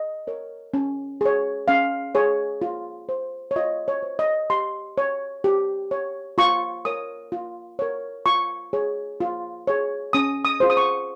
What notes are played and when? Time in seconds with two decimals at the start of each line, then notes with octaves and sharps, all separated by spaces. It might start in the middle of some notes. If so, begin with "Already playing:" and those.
Already playing: D#5
0.27 A#4 C#5
0.74 C#4
1.21 G#4 C#5
1.68 C#4 F5
2.15 G#4 C#5
2.62 F4
3.09 C5
3.51 C#5
3.56 F4 D#5
3.88 C#5
4.03 C5
4.19 D#5
4.50 G4 C6
4.98 C#5
5.44 G4
5.91 C#5
6.38 F4 C#6
6.85 A#4 C#5 D#6
7.32 F4
7.79 A#4 C#5
8.26 F4 C#6
8.73 G#4 C#5
9.20 F4
9.67 G#4 C#5
10.13 C#4 D#6
10.45 D#6
10.60 F4 G#4 C5
10.70 D#6
10.77 C#6